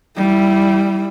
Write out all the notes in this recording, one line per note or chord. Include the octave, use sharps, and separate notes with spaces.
G3 E4